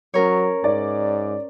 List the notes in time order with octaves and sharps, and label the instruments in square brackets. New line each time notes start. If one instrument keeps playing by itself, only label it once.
[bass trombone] F#3 [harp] C#4 A#4 C#5
[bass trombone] G#2 [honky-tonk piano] D5